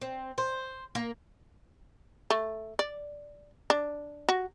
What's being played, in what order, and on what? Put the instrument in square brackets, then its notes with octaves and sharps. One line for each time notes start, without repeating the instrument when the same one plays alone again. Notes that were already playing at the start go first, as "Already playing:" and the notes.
[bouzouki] C4
C5
A#3
[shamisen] A3
D5
D4
F#4